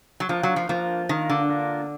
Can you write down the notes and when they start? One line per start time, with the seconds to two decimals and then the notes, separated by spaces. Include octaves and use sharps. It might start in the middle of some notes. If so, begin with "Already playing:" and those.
0.20 F#3
0.29 F3 A#3 D4 F4 A#4
0.43 F#3
0.56 F3
0.69 F3 A#3 D4 F4 A#4
1.09 D#3 A#3 D4 F4 A#4
1.30 D3
1.49 A#3 D4 F4 A#4